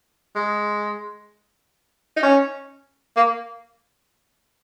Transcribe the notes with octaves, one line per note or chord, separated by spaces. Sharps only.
G#3
D#4
C#4
A#3